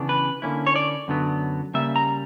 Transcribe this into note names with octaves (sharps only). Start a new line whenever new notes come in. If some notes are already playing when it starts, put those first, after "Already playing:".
Already playing: C#3 E3 B3 D4
B4
D3 A#3 C#4 E4
C#5
D5
F#2 D3 F#3 B3
C#3 G3 A#3 E5
A#5